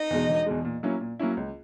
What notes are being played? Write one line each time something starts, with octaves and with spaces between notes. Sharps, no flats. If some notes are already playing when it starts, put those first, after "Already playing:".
Already playing: D#4 D#5
E2 B2 G#3
E1
E2 B2 G#3
A#2
F#3 A#3 C#4 E4
A#2
F#3 A#3 C#4 E4
C#2